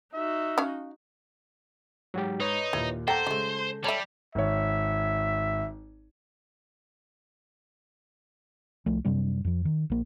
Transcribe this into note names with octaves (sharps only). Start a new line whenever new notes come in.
D#4 F#4 E5
C#4 F5
G#2 F#3 F#4 G4
D#4 B4 C#5
D#2 A#2 E4
A#3 A4 C5 F#5 G5 A#5 G6 A#6
C#3 F#3 G#3 A3
G3 C#5 E5 A5 B5
G#1 C#5 E5
C2 F3 A3
F#2 C3 G3 D4
F2 F3
D#3
A#1 A#3